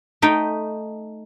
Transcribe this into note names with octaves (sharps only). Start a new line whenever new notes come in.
A3 D#4 G5